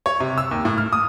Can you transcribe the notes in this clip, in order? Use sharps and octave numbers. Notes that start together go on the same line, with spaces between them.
C#5
C3
E6
D#2
A2
F6
D#6